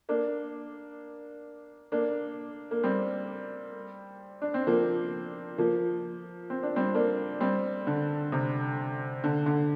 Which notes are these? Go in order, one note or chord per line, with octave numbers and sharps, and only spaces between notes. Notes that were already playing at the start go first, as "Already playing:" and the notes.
A#3 D4
A#3 D4
A#3
G3 C4
D4
C4
F3 A#3
F3 A#3
C4
D4
G3 C4
A#3 D4
G3 C4
D3
C3
D3
D3